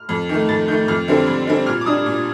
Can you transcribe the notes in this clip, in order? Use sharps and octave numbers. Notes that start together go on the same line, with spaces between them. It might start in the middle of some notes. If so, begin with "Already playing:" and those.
Already playing: F6
F2
D#3 A3
F2 A6
D#3 A3 G6
F2 F6
D3 G3 C4
F2
D3 G3 C4
A#2 F6
D6
G3 D4 D#6
A#2